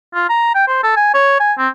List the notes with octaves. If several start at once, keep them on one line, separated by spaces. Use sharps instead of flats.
F4
A#5
G5
C5
A4
G#5
C#5
G#5
C4